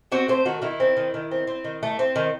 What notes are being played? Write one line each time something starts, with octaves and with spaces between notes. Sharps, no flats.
C4 F#4
A3 C5
D#3 F#4
D#3 E4
C4
D#3
D#3
C4
C4
D#3
A3
C4
D#3